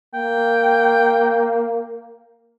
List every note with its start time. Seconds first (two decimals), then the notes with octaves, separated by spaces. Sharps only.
0.14 A#3 G5